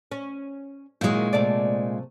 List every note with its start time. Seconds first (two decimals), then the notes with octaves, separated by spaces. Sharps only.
0.12 C#4
1.01 A#2 D#3 F#3 G#3 E4
1.33 C3 A3 D5